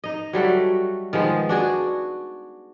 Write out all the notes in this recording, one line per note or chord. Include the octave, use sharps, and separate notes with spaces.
D#4 D#5
F#3 G3 A3 F#4
D#3 F3 G#3 B3
D4 F#4 G#4 D5